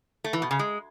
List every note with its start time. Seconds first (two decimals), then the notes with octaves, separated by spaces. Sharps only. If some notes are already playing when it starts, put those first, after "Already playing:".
0.24 A3
0.33 E3
0.42 B2
0.51 C#3
0.59 G#3